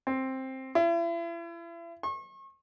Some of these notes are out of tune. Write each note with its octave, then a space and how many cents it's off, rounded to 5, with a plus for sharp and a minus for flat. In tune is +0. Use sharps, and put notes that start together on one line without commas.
C4 +10
E4 +40
C#6 -40